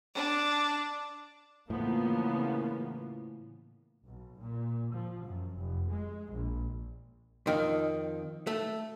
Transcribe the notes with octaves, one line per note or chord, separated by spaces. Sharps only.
D4
A2 C#3 E3 F3 A#3 B3
B1
A#2
F3
F#2
F1
G#3
A#1
F2 D#3
A3